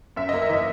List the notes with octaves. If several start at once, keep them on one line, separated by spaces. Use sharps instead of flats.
F#2 E5
A#3 D#5
E5
E3 D#5